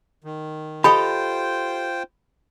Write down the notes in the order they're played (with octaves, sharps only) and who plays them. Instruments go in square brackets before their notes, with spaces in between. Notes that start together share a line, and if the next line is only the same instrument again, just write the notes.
[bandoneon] D#3
[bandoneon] F4 C5 G5 [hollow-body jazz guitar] G4 A4 D#5 [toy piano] B5